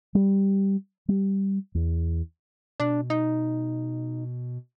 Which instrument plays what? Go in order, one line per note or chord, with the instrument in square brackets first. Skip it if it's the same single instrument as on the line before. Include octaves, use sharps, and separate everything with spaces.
[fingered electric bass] G3
G3
E2
[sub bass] B2 [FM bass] D4
[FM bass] D#4